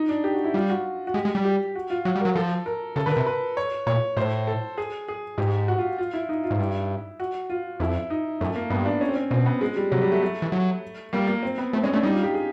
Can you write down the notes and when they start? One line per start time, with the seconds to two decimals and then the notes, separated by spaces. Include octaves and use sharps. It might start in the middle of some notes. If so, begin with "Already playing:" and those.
Already playing: D#4
0.09 D4
0.24 G4
0.34 F#4
0.44 E4
0.54 G3 F4
0.70 F#4
1.07 F#4
1.14 G#3 G4
1.25 G#3
1.35 G3
1.45 G4
1.75 F#4
1.90 F4
2.05 F#3 F#4
2.15 G3
2.21 F#3 A#4
2.35 F3 A4
2.66 A#4
2.96 C#3 A4
3.06 D3 B4
3.12 A#4
3.17 C3
3.26 B4
3.57 C#5
3.87 A#2 C#5
4.17 A2 C5
4.47 A4
4.78 G#4
5.08 G#4
5.38 G#2 G4
5.68 F#4
5.78 F4
5.98 F4
6.14 E4
6.29 D#4
6.44 F4
6.51 G#2
6.59 G2 E4
7.20 F#4
7.50 F4
7.80 F2 E4
8.10 D#4
8.41 F#2 A3
8.56 A#3
8.70 G2 B3
8.85 D4
9.01 C#4
9.09 C4
9.16 C#4
9.31 B2 C4
9.46 B3
9.61 G#3
9.76 G3
9.92 C3 F#3
10.02 G3
10.12 A3
10.23 A3
10.42 E3
10.52 F#3
11.13 G3 A#3
11.27 A#3
11.43 C4
11.58 B3
11.73 A3 C4
11.84 G#3 C#4
11.93 A3 D4
12.03 G3 D#4
12.14 F4
12.23 G4
12.34 G#4